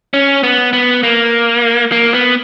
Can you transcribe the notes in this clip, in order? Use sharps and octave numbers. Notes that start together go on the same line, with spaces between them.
C#4
B3
B3
A#3
A#3
B3